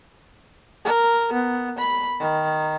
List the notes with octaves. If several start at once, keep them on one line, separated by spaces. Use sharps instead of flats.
A#4
B3
B5
D#3